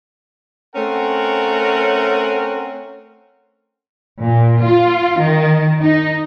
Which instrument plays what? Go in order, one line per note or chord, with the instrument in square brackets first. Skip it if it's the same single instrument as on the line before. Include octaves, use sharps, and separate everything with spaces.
[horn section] A3 C4 C#4 A#4 F#5
[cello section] A#2
F4
D#3
D#4